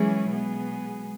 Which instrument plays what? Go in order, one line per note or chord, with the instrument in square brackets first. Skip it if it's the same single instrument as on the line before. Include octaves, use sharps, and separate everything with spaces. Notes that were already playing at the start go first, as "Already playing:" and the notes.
Already playing: [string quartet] E3 C#4 E4 G#4 [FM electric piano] F#3 G#3
[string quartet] B2 B3 G#4